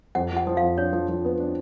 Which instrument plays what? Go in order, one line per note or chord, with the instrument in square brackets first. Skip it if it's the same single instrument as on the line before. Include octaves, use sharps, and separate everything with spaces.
[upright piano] F2 [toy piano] F#5
[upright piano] F3
[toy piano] F#5
[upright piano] F3
[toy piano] F5
[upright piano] F2
[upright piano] D4 [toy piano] C#5
[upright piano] F3
F3
B3
D4